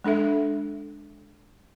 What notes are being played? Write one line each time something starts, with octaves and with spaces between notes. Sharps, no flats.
G#3 D4 A4 E5